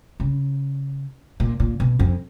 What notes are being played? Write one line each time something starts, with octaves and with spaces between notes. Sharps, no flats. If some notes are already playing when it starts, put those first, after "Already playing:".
C#3
A#2
A#2
B2
F2